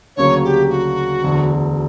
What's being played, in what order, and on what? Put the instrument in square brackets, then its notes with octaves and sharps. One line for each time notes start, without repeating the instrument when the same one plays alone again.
[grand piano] D2 C#3 F#3 A#3 C#4 [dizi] C#5
[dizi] G4
F#4
[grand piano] E1 D2 D3